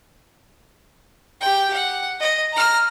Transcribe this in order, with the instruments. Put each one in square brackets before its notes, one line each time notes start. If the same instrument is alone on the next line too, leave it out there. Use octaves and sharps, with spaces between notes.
[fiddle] G4 G5
F#5
D#5
A#5 F6